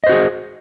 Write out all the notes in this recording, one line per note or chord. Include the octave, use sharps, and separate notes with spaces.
F#4 G#4 C5 D#5